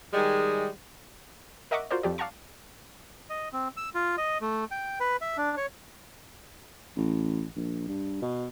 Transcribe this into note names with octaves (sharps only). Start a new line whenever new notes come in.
D#3 G3 G#3
A#4 D#5 E5 F#5 C#6 D6
F4 F#4 A#4 C5 D5
F2 F3 G4 D5
D5 F5 F#5 A5 A#5 C#6
D#5
C4
E6
F4
D#5
A3
G5
B4
E5
D4
C#5
A1
A#1
G2
B2